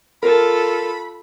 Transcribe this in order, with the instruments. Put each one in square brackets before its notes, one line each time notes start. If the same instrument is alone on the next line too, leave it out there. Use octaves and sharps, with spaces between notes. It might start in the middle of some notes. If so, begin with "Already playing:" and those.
[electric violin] F4 A4 [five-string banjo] A#4 [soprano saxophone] B5